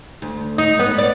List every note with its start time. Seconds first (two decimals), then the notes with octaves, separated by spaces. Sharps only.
0.22 D2
0.58 D#4
0.79 B3
0.98 D5